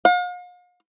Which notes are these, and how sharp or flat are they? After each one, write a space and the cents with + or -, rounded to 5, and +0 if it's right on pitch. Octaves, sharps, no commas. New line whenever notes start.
F5 +45